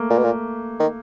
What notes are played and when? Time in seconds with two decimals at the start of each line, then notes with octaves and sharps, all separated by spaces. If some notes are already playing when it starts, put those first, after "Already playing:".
Already playing: A3 A#3
0.10 A#2
0.18 B2
0.24 A#2
0.80 D#3